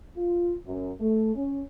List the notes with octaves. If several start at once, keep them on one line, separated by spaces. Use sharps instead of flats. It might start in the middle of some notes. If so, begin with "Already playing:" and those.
F4
F#2
A3
C#4